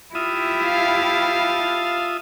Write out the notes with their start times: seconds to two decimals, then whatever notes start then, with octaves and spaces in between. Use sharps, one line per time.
0.15 E4 F4 G4 E5 D#6
0.64 F5 A5